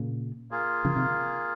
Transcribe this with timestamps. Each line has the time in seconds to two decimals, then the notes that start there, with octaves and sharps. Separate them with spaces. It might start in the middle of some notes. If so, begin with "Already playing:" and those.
Already playing: A#2 C#3
0.51 A#3 F4 G#4
0.85 C#3 F3
0.96 C3 D#3